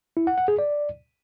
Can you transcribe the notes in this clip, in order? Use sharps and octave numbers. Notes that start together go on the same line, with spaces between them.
E4
F#5
F#5
G#4
D5